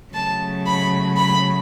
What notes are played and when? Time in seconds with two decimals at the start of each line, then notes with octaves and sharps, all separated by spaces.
0.13 C#3 F#3 A3 A5
0.66 B5
1.17 B5